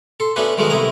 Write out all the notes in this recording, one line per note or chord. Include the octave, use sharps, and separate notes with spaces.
A4 C6
A3 B3 C#4 D4 F#4 B4
D#3 F#3 G#3 A3 B3 A#4
B1 C3 A3 E4 D#5 A#5